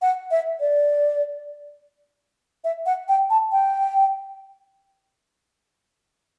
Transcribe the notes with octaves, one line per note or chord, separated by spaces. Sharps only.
F#5
E5
D5
E5
F#5
G5
A5
G5